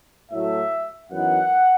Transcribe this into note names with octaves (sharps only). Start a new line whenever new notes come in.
A2 F#3 A3 E5
F#2 E3 B3 D#4 F#5